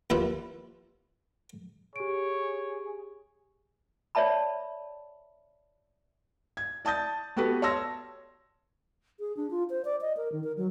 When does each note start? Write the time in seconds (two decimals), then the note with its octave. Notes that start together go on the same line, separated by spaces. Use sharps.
0.10 D#2 G3 E4 F4 B4
1.96 G4 G#4 C#5 D7
4.15 C#5 D5 E5 A5 B5
6.57 G#6
6.85 D5 A5 D#6 G6 A6
7.37 B3 F#4 G4 A4 B4
7.62 C#5 A5 C6 E6 A#6
9.20 G#4
9.37 D4
9.51 F4
9.70 C5
9.85 D5
10.01 D#5
10.17 A#4
10.32 D#3
10.44 A#4
10.57 F#3